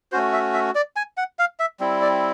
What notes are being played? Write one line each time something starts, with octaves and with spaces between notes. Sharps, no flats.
A3 C#4 F#4 C5
E5
E5
D5
G#5
F#5
F5
E5
G3 C4 E4
D5